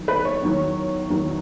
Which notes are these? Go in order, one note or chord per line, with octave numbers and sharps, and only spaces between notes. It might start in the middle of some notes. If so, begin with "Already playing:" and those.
Already playing: E2 D#3 F#3
B4
C#5
E2 D#3 F#3
E2 D#3 F#3